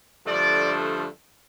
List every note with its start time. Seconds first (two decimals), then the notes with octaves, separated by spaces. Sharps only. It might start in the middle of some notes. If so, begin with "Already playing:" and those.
0.25 G2 D3 F3 A3 D5